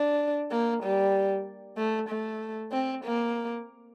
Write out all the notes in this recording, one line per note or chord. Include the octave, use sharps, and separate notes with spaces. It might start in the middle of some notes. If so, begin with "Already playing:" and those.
Already playing: D4
A#3
G3
A3
A3
C4
A#3